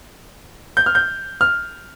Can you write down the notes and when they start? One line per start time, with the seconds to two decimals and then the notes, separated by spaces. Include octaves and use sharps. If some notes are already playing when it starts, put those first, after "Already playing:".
0.77 G6
0.86 F6
0.95 G6
1.41 F6